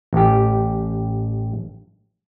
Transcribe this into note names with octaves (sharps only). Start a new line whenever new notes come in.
A1 G4